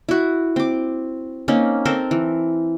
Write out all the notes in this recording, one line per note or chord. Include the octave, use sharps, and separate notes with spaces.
E4 F#4
C4 D6
A#3 C4 C#4 D#4
C4 A4 A#4 C5
E3